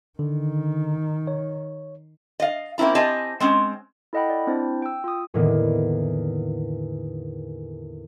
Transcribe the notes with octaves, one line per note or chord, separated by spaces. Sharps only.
D3 D#3
C#5
D#5 F5
A#3 C4 C#4 E4 A#5
C4 G4 D#5 G#5 A5
G#3 C4 C#4
E4 A4 D#5 F#5 G5 B5
D5
C4 D4 E4 C5
G5 E6
F4 D#6
E2 A2 D3 D#3 A#3 B3